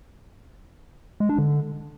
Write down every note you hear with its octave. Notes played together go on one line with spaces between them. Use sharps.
G#3
D4
D3